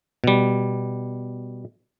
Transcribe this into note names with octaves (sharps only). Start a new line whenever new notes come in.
B2 G3